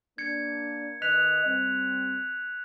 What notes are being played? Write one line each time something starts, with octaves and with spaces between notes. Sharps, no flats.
A#3 D4 G#6 C#7
D#3 B4 D#5 F#6 B6 F7
G3 C4